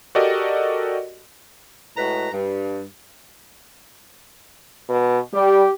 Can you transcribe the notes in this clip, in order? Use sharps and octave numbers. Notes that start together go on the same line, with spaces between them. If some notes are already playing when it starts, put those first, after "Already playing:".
F#4 G4 A4 A#4 D5 D#5
A2 G#3 F#4 B4 A#5
G2
B2
G3 G4